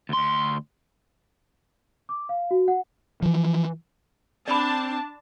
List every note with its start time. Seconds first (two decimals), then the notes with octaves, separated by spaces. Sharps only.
0.09 D2 C6
2.09 D6
2.29 F5
2.51 F#4
2.68 F#5
3.22 E3 F3
4.48 C4 D4 D5 A5 B5